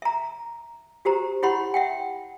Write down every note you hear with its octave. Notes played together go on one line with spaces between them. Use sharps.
E5 A#5
F#4 G4 C5 A#5
E4 G4 C#5 F#5 B5 C6
E5 F#5 G5